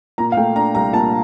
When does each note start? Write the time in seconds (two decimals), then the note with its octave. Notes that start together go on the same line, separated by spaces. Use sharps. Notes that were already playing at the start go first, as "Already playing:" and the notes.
0.18 A#2 A#5
0.32 F5
0.37 A3 G5
0.56 D4 A#5
0.75 C2 A#5
0.93 A#2 A5